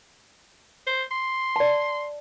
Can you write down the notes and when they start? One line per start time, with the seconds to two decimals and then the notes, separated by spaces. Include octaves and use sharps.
0.87 C5
1.11 C6
1.56 D5 A5